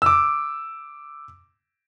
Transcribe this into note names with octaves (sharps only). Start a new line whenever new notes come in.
D6 E6